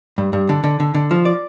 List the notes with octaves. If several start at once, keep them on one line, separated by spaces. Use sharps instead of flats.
G2
G2
D3
D3
D3
D3
F3
D5